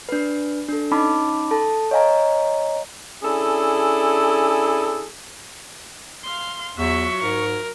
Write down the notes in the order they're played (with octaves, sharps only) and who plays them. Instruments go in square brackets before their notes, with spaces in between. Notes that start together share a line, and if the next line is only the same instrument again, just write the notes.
[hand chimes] D4 B4
D4 A4
C#4 D#4 A5 B5 D6
A4 A5
C#5 D#5 F5 G#5 A#5
[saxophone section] C#4 D4 E4 G#4 A4
[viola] F5 C6
[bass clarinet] E2 [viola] F#3 F4 [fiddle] E5 [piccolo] C#6
[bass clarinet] G#2 [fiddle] A#4